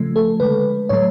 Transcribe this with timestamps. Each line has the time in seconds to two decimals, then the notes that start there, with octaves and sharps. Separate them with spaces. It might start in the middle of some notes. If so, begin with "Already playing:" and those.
Already playing: C#3 F3 A3
0.16 A4
0.40 D3 G#3 B4
0.89 A2 F#3 A3 C#5